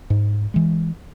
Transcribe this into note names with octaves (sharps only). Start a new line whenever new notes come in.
G#2
E3 G#3